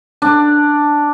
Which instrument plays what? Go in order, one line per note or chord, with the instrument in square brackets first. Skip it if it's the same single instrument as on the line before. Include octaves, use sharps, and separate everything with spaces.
[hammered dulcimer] D4